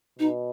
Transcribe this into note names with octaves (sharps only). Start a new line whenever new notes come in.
B2 D#4